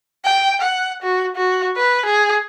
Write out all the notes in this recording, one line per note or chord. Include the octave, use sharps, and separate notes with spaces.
G5
F#5
F#4
F#4
B4
G#4